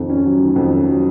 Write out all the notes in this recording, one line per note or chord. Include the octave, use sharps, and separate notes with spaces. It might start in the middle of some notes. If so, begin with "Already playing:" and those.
Already playing: F2 D#3
C#4
F#3
D#3
F2
C#4
F#3